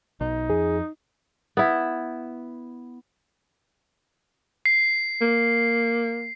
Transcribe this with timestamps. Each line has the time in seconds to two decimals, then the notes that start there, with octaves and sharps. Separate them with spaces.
0.21 B1 D#4
0.50 F2 G#4
1.57 B3 E4
4.66 C7
5.21 A#3